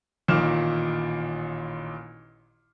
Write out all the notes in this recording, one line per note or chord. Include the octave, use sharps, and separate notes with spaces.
A1 A#2 D#3 F6 E7